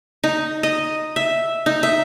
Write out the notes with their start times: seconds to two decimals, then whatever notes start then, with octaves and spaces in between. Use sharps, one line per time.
0.24 D#4
0.63 D#5
1.16 E5
1.66 D#4
1.83 E5